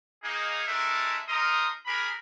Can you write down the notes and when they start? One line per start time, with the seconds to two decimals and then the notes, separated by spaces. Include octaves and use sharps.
0.23 A#3 D#4 G#4
0.66 G#3 A3 D4 A4 A#4 E5
1.28 D#4 A4 A#4 A#5 C6 D#6
1.86 D4 G4 G#4 A#4 B5